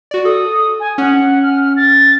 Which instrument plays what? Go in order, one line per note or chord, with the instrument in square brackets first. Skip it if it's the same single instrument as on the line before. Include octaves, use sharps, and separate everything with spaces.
[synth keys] F#4 D5
[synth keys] A4 [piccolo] D#6
[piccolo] G#5
[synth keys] C#4 [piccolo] F#5
[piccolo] F6
A6